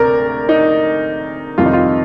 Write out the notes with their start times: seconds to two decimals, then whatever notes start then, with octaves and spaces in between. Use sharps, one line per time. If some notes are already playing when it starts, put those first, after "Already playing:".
Already playing: D2 C3 A#4 D5
0.49 D#4
1.58 F2 C3 D#3 G3 F4
1.66 D#4
1.73 F4